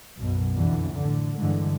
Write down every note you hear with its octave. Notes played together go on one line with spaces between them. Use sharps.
B1 F#2 B2
F2 B2 D3 E3
A2 D3
G2 D3 E3 G#3